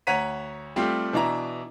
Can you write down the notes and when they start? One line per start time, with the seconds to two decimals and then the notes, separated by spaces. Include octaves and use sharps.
0.07 D2 C#5 F#5 A#5 B6 D#7
0.76 G3 A3 C4 F4 G4
1.13 B2 E3 D4 E5 A#5